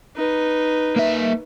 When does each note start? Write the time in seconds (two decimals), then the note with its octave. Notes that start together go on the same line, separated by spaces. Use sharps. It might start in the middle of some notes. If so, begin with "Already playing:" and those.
0.16 D#4 B4
0.96 A#3 E5